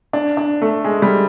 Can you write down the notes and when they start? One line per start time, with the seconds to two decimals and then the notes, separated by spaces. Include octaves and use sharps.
0.13 D4
0.37 D4
0.62 A3
0.85 G#3
1.02 G3